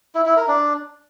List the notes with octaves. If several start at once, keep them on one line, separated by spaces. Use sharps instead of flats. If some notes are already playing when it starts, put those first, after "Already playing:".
E4
E4
A#4
D4